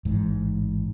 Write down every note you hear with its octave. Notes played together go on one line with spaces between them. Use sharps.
A1 G#2